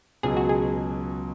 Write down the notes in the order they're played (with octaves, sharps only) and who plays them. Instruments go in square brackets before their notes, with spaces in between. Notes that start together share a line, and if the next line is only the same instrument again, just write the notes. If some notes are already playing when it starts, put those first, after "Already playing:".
[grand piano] C#2 B2 F#3 [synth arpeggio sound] G#4
[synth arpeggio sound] F#4
G#4